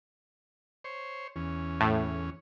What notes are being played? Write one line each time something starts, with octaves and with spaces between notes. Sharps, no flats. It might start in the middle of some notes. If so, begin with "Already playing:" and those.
C5 C#5
E2 C#4
A2